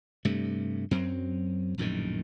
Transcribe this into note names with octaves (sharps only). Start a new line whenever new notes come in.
G2 C3 A3
F#2 F#3 C4
A#1 F#2 A2 D#3